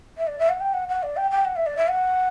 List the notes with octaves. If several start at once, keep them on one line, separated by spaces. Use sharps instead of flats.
E5
D5
E5
F#5
G5
F#5
F#5
D5
G5
G5
F#5
E5
D5
E5
F#5